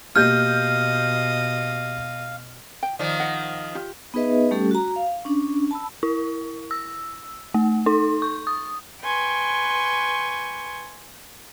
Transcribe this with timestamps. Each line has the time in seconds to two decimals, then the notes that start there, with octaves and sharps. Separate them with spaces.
0.16 B2 A#3 G4 D#5 F5 F6 G6
2.83 G5
2.99 D#3 F3 D5
3.20 D#5 F#5
3.75 F4 G4
4.14 B3 D#4 G#4 B4 D#5 E5
4.51 G3 A3 C#4 G4 A4
4.71 F#4 A#5
4.96 F5
5.25 C#4 D4
5.71 A5 B5 E6
6.03 E4
6.71 E6
7.54 A3
7.86 D#4
8.22 C#6
8.47 D#6
9.03 B4 G5 G#5 C6 C#6